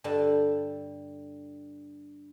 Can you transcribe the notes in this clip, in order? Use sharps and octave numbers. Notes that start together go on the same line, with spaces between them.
G2 D3 G3 A5